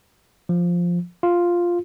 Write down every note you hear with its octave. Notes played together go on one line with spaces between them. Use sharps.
F3
F4